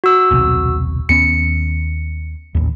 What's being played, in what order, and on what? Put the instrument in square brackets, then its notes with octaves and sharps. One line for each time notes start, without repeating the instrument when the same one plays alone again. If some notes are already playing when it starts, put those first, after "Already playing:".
[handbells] F#4 E6
[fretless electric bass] D#1 B1 C3
[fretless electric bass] D#2 B3 C#4 [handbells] C#7
[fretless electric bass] A1 D#2